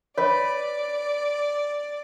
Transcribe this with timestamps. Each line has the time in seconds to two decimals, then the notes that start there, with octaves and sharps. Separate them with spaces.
0.18 B4 C#5 D5